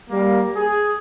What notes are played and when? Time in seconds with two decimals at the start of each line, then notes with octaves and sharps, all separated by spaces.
0.10 G3 A#3
0.57 G#4